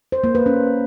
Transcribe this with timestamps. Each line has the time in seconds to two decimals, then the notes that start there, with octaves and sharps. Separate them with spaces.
0.12 C5
0.24 A#3
0.35 B4
0.46 C#4